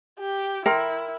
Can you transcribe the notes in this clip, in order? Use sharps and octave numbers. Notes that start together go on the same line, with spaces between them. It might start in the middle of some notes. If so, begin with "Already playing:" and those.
G4
E4 A#4 G5 C6